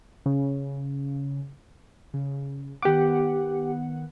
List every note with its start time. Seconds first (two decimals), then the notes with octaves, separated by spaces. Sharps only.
0.26 C#3
2.14 C#3
2.83 D#3 B3 G4 F#5 D6